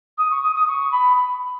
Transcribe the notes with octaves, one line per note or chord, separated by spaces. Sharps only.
D#6
C#6
D#6
D#6
C#6
B5